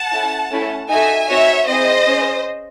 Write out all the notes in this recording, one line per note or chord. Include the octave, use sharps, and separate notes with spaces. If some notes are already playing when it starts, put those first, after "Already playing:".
Already playing: F#5 A5
C#4 E4 A4
A3 C#4 E4 A4
D#4 F#4 A4 E5 G#5
C4 D#4 F#4 C#5 E5
C4 E4 G#4 C5 D#5
C#4 G#4